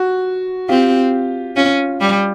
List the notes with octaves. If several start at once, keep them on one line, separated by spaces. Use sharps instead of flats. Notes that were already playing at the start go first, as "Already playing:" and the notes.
Already playing: F#4
C4 F4 G4
C#4 F4
G3